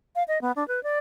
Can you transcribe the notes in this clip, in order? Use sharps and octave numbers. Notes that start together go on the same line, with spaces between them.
F5
D#5
B3
D4
B4
D5